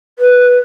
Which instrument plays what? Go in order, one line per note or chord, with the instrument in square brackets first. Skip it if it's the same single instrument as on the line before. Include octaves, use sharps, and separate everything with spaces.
[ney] B4